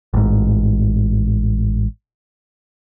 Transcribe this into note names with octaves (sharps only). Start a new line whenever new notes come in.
A1 G#2